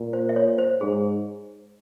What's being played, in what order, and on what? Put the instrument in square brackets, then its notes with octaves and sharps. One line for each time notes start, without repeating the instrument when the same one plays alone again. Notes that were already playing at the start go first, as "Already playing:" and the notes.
Already playing: [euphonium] A#2
[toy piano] C5
E5
C#5
C5
[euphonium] G#2 [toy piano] G#4